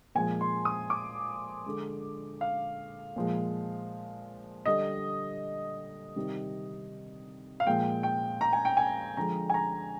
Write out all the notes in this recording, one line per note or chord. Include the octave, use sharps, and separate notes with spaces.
A#2 F3 G#3 G#5
C6
D#6
D6
D3 G#3
F5
A#2 F3 G#3
D3 G3 D#5
C3 D#3 G3
F5
A#2 F3 G#3 G5
G5
A#5
G#5
G5
G#5
D3 F3 G#3 A#5
G#5
A#5